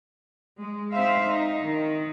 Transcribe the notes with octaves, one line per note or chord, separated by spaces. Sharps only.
G#3
C4 D#4 C5 E5 F5
D#4
D#3